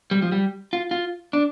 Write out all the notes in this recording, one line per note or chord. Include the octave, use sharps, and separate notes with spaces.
G3
F3
G3
F4
F4
D4